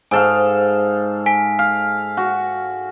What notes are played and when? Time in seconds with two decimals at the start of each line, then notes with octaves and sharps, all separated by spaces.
0.11 G#2 A4 F5 G#5
1.26 G#5 B6
1.59 F5
2.17 F#4